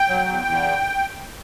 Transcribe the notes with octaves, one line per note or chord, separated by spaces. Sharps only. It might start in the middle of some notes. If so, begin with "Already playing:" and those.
Already playing: G5
F#3
E2
E2